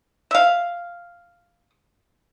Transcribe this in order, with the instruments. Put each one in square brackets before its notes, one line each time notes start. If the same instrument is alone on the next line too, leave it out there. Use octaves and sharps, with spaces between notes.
[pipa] E5 F5